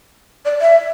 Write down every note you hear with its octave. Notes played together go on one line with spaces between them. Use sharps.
D5
E5